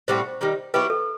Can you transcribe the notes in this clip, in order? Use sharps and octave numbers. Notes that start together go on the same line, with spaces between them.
A2 G3 C4 F#4 C5
D#3 G3 D#4
F#3 B3 E4 G4 B4
A4